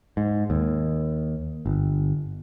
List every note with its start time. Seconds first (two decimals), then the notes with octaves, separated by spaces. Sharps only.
0.17 G#2
0.50 D#2
1.66 G1